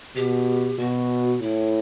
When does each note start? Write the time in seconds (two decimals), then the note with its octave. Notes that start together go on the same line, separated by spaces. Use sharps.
0.16 B2 G4
0.79 B2 F#4
1.42 A2 E4